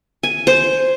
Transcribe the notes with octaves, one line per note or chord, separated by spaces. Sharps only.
G#5
C5